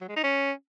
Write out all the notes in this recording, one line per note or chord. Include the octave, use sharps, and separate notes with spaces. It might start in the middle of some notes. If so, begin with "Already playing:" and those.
F#3
G#3
D#4
C#4